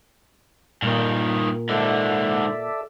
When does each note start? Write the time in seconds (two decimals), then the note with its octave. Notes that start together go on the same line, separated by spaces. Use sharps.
0.82 G2 A#2 D#3
1.69 G#2 D3 A4 D5 E5